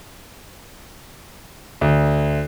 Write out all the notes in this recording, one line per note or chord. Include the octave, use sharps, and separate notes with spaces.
D2